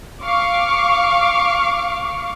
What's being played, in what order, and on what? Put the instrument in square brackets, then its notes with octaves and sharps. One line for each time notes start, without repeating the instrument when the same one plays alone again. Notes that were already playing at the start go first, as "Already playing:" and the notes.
[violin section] F5 C#6 D6